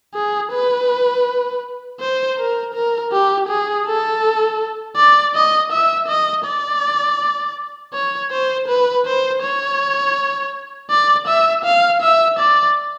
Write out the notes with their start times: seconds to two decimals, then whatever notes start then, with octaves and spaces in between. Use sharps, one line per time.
0.14 G#4
0.52 B4
2.00 C5
2.38 A#4
2.74 A#4
3.12 G4
3.48 G#4
3.86 A4
4.96 D5
5.34 D#5
5.72 E5
6.08 D#5
6.45 D5
7.93 C#5
8.31 C5
8.67 B4
9.05 C5
9.42 C#5
10.90 D5
11.27 E5
11.64 F5
12.02 E5
12.39 D5